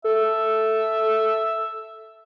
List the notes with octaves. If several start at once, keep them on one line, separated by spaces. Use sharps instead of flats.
A4 E5